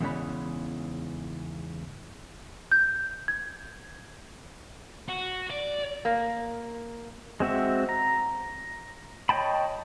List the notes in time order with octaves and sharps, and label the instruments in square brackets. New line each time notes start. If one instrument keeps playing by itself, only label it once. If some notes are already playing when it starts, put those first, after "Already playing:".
[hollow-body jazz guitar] E2 G#2 C#3 E3 C#4 B5
[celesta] G6
G#6
[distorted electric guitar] F#4
D5
[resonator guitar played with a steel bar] A#3
[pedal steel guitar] G#3 C4 F#4 E5
A#5
C#5 D#5 G5 A5 B5